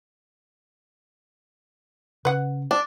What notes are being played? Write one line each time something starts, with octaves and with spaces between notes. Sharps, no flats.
C#3 B4 F#5
D4